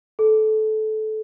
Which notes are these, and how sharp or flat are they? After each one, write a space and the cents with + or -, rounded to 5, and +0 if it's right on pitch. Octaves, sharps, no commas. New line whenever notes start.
A4 -20